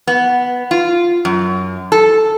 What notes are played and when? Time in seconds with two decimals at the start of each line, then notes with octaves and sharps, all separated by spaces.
0.07 B3
0.71 F4
1.25 F#2
1.92 A4